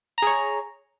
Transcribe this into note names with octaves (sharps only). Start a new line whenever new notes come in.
G#4 C#5 A#5